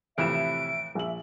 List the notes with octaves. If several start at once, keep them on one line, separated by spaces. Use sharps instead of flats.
F2 A2 C3 E3 E5 B5 D7 E7
A#1 E5 F#7